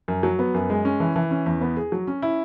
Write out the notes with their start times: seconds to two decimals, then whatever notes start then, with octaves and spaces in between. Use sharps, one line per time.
0.08 F#2
0.23 F#3
0.39 B3
0.54 F#2
0.70 G#3
0.85 C#4
1.00 E3
1.16 E3
1.31 C#4
1.46 E2
1.61 B3
1.77 G#4
1.92 F#3
2.07 C#4
2.22 E4